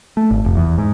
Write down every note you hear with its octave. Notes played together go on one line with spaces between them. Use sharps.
A3
G#1
F1
E2
G#2